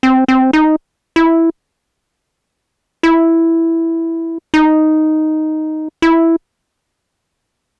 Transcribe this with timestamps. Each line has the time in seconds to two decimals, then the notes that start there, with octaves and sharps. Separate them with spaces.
0.03 C4
0.28 C4
0.53 D#4
1.16 E4
3.03 E4
4.54 D#4
6.02 E4